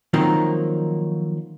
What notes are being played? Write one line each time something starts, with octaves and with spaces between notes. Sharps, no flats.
D#3 F3 F#3 A#3 C4 D#4